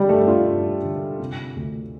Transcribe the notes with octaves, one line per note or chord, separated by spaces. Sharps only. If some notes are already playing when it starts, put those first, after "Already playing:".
Already playing: D3 G3
G2 A3
D4 F4
G2
D3
C3
D2